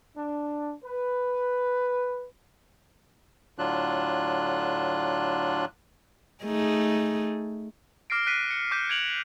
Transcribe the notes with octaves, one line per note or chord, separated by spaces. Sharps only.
D4
B4
A2 D3 F#3 D4 F4 F#6
A3 D#4 G#4
D6 F6 A#6 C7 D7
F#6 B6 C7 D#7
C#7
D6 F6 G6 B6 C7 D#7
G#6 D7 F7 F#7